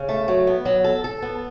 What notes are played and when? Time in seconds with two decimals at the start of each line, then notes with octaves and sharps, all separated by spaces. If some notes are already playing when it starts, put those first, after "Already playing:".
Already playing: C#3
0.09 A3
0.28 F#3
0.47 B3
0.65 F#3
0.84 A4
1.04 A4
1.22 B3